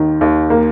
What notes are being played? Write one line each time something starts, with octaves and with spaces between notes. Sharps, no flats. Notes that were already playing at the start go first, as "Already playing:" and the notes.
Already playing: D#2 D#3
D#2
A#3